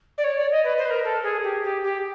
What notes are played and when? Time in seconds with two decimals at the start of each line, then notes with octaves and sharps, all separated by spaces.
0.18 D5
0.24 C#5
0.37 D5
0.51 D#5
0.64 B4
0.78 C5
0.85 B4
0.90 A#4
1.04 A4
1.23 G#4
1.44 G4
1.64 G4
1.83 G4